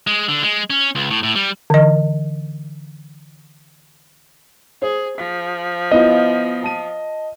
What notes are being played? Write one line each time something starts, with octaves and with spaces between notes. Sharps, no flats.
G#3
D3
G#3
C#4
C#2
A2
A2
G3
D3 E3 D#5
G#4 C5
F3 B6
B3 E4 F4 D#5
A5 D#7